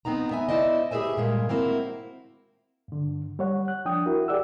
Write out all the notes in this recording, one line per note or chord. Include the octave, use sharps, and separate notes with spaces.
B3 C4 D#4 A#5
B3 E5 G#5
E4 C5 D5 D#5
G4 G#4 B4 C5 E5 G#5
G2 A#2 G#3 A#3
A#3 C4 E4 F#4
G2 D3
G3 C#5 F#5
F#6
F3 D4 G5 D#6
E4 F#4 A#4
G4 G#4 D5 F#5 E6